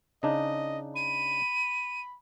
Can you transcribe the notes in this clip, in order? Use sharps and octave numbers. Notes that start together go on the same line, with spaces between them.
C#3 D4 D#4 D#5
B5 D#7